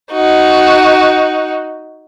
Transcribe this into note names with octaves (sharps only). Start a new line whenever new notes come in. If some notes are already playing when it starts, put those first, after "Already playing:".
D#4 F#4